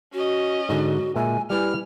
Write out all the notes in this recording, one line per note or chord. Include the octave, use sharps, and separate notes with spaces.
C#4 F#4 D#5
G#2 D3 F#4
A#2 G#3 E5 G#5
G3 E4 B4 G#5 F6